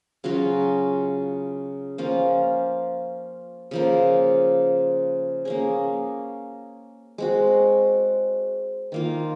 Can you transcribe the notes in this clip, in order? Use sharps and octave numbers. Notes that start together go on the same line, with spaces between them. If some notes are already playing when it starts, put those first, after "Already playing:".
C#3 F#3 C#4 F4
F3 A#3 C#4 F4
C#3 F3 A#3
A#3 C#4 G#4
G#3 C4 F#4
D#3 A#3 F4